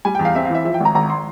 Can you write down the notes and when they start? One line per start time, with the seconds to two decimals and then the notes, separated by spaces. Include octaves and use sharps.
0.05 G3 G#5
0.15 G5
0.19 E2
0.25 F5
0.35 C4 E5
0.45 F5
0.50 E3 E5
0.65 F3 E5
0.74 G5
0.80 G#1 A#5
0.95 G#1 A#5
1.10 C6